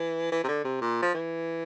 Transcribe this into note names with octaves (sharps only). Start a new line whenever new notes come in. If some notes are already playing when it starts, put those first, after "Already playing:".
Already playing: E3
E3
C3
D3
C3
A#2
F3
E3